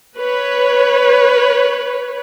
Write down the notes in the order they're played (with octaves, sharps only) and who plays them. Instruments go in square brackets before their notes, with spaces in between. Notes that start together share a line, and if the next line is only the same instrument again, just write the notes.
[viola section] B4 C#5